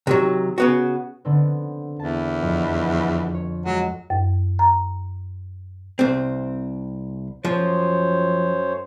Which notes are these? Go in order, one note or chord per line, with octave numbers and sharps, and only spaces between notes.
C3 D#3 F#3
C#3 B3 F#4
D3 B3 C4
E2 A5
F2
C#5
F#3 G#3
F#2
A#5
C2 C4
F#2 F3 C5 C#5